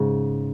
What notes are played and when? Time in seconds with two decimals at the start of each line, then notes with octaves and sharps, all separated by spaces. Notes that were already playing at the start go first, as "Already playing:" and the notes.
Already playing: G#2 C#3